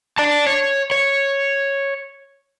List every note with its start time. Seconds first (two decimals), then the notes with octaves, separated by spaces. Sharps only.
0.18 D5 A5
0.47 C#5
0.91 C#5